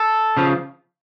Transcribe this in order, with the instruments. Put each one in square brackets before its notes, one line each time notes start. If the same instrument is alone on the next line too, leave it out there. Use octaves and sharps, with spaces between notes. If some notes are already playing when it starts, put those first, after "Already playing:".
Already playing: [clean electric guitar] A4
C#3 F3